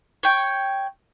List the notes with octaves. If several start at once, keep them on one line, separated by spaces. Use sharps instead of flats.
C#5 G5